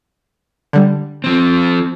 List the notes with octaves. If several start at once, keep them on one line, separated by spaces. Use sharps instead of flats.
D3 G3
F3 C4